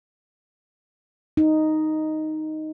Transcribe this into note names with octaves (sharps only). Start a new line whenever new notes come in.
D#4